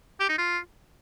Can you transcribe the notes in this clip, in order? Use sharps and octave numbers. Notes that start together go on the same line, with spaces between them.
G4
D#4
F4